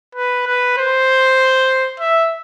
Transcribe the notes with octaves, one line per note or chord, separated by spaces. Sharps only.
B4
B4
C5
E5